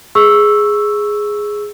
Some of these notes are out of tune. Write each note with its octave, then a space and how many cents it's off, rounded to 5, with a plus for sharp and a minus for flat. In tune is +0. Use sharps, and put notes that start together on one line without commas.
G#4 +0 C#6 +0 E6 +0